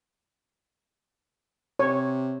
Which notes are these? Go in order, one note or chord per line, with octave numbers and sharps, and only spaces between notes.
C3 C#5